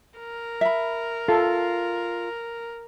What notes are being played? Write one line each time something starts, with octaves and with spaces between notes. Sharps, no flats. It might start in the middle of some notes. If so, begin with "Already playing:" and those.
A#4
E5 B5
F4 A4